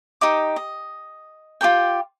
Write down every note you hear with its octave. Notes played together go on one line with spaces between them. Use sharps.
D#4 G4 D#5 D6
D#5
F4 G4 A4 G5